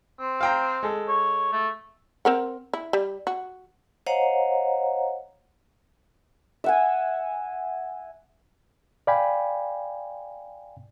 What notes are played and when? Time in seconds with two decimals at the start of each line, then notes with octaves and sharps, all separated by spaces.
0.19 C4
0.41 F5 G5 A#5
0.83 G#3 A4
1.08 C#5
1.53 A3
2.25 C4 A#4 F#5
2.73 E4
2.93 G3
3.27 F#4
4.06 C5 C#5 D#5 F5 F#5 A#5
6.64 E5 F#5 G#5
9.07 D5 F5 G5 G#5 B5